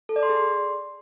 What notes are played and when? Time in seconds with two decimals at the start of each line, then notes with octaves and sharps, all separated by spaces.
0.09 A4
0.16 D5
0.23 C6
0.30 G#4
0.36 C6